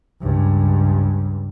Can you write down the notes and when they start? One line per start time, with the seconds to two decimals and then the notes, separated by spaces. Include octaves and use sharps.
0.21 C#2 G2